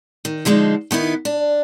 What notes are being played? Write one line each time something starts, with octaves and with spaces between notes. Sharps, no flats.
D#3
D3 F3 G#3 C4 D#4
D#3 B3 D#4 E4
D4